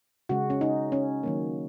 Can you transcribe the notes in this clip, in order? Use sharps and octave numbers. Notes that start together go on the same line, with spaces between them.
C#3 G#3 F#4
C#4
D#4
C#4
D#3 F#3 A#3